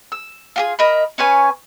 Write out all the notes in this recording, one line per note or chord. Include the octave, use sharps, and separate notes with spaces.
E6
F4 G4 G#4
A#4 D#5 E5 B5
C#4 B4 C#5 G#5